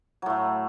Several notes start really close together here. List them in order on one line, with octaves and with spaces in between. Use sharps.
F#3 A2 A3